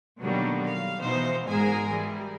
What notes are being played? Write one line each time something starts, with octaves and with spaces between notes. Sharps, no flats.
B2 D3 D#3 F#3 G3 A#3
F5
B2 E3 D#4 C5
G#1 G#2 G#3 G#4 A#4 G#5
E3 G3